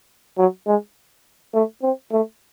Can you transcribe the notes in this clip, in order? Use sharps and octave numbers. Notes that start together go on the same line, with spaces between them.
F#3
G#3
A3
C4
A3